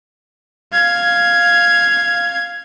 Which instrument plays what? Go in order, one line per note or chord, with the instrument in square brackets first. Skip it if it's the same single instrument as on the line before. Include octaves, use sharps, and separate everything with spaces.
[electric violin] F5 G#6